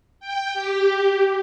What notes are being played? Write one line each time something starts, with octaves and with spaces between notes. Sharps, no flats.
G5
G4